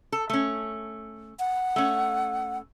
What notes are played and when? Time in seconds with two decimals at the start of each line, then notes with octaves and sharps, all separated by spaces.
0.12 A4
0.30 A3 C#4
1.39 F#5
1.76 A3 C#4